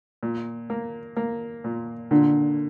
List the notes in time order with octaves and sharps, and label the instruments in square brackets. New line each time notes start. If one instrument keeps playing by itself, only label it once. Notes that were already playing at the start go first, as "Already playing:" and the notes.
[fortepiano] A#2
A#3
A#3
A#2
[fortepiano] A#2 [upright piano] D3